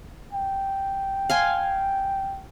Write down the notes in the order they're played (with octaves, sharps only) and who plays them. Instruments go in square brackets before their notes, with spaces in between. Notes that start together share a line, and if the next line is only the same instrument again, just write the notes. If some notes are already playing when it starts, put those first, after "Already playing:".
[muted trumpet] G5
[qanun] F5 G#5 C6